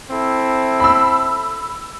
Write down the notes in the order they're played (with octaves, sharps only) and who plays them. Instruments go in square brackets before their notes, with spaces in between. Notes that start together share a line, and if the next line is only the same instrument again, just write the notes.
[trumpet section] C4 E4 A4
[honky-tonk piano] B5 E6